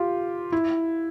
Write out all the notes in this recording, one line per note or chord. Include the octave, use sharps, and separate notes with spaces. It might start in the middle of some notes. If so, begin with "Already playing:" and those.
Already playing: F4 G4
E4